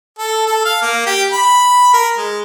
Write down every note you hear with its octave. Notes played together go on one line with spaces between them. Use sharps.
A4
A4
F5
A#3
G4
B5
A#4
G#3